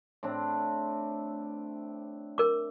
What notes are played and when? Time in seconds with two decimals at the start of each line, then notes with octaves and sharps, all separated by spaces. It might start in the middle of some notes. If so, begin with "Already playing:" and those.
0.23 A2 C4 D4
2.38 A#4 D6